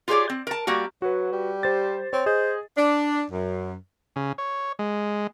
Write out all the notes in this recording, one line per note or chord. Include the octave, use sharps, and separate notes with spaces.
F4 G4 G#4 B4 C#5 D5
C4
A#4 A5
G3 A#3 F#4
F#3 F#4 B4
G3
G4 C5 A6
C4 C#5
G#4 C5 D#5
D4
F#2
C#3
C#5
G#3